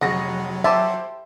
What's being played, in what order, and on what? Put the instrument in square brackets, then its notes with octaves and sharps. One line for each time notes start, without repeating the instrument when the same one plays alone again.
[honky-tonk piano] F1 G#4 A#6 [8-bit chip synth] F#3 [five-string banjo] F#4
[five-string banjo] G4 G#5 A5 [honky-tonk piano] C5 C6 D6 [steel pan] E5